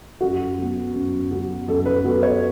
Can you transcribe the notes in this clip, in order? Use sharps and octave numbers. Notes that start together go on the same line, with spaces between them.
F#2 F#4
F#3 B3
F#2
F#3 B3
F#2 A4
A4
B4
F#3 B3
C#5